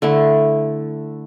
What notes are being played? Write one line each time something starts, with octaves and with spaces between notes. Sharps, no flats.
D3 A3 E4